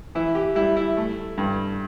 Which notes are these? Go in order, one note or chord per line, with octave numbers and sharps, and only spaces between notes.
E3 E4
G4
G3 E4
E4
A3
G2